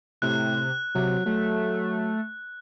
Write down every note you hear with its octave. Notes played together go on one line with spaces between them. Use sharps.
A2 C3 F#6
C3 F#3
F#3 A3